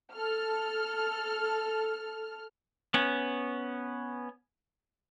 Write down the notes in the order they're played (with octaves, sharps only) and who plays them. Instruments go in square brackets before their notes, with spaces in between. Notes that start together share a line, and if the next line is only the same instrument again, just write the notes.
[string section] A4 F6
[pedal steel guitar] B3 C#4